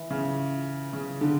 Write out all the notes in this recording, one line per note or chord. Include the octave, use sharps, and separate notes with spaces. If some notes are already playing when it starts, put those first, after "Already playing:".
Already playing: E3
C#3
C#3
D3